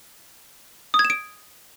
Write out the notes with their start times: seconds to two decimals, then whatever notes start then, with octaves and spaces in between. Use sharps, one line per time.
0.94 D#6
0.99 G#6
1.05 E7
1.10 D7